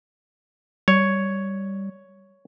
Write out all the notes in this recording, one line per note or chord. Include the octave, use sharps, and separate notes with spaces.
G3 C#5